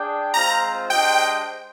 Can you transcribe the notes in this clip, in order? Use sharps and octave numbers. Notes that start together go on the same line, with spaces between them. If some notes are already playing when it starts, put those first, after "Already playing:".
Already playing: D4 G#4 D5 G5
G#3 C4 F4 C5 F5 A#5
G#3 D4 G4 C5 D#5 G5